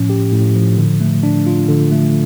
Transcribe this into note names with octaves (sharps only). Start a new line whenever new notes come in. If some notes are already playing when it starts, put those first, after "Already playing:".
Already playing: A2 F3 C#4
G4
A2
F3
D3
A3
D4
F4
D3
A3